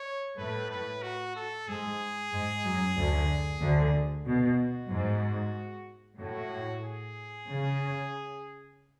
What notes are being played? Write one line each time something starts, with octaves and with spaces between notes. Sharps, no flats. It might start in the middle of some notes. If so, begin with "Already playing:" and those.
Already playing: C#5
A2 A3 B4
B4
F#4
A4
G#2 G#3 G#4
G#2 G#3
F#2 F#3
D2 D3
D2 D3
B2 F#4
G#2
A2 F#4
G#4
C#3